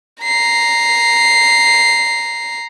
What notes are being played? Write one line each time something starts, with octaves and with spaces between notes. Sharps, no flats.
A#5 C7